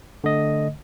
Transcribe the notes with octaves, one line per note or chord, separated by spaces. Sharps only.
D3 A3 D#5